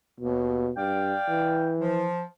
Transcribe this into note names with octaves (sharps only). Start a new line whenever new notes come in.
D#2 B2
G2 D5 F5 G5
E3
F3